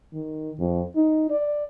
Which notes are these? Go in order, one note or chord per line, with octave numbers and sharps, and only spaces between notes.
D#3
F2
D#4
D5